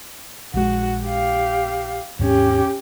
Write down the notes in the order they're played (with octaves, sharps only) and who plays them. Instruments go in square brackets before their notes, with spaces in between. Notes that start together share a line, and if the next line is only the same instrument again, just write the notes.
[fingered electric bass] A#1 G#3 [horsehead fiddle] F#4
[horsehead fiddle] G4 F5
[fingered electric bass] D#2 G#2 [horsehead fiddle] C#4 G4